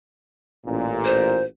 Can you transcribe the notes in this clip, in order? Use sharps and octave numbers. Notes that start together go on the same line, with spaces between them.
A1 A#2
C5